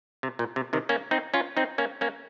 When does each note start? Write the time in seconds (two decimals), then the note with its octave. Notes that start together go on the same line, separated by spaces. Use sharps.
0.23 C3
0.39 A#2
0.56 C3
0.73 C3 D#3
0.89 A#3 C#4
1.11 C4 D#4
1.34 C#4 F4
1.57 C4 D#4
1.78 A#3 C#4
2.01 A#3 C#4